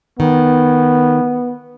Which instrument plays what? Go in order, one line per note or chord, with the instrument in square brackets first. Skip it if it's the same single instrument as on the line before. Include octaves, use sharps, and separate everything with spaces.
[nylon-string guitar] D#3 [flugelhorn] B3